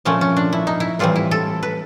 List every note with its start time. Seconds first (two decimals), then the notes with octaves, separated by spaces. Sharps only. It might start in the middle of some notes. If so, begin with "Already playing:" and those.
0.05 A#2 F3 A3 C4 C#4
0.21 C#4
0.37 D4
0.53 E4
0.67 D#4
0.80 E4
0.99 A2 E3 G3 C4 F4
1.16 E4
1.31 A4
1.63 B4